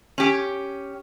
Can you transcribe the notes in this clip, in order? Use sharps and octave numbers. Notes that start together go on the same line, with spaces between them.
C#4 G4